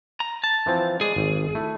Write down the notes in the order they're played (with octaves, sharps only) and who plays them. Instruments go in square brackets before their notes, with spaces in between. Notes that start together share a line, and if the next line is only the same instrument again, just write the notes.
[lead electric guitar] A#5
A5
[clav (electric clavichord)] E3 F3 C4
[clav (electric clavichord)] G#3 D5 [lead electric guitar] G#4
[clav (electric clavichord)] G#1
A3 E4